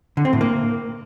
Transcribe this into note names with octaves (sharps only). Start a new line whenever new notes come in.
D3
C4
A2
A#3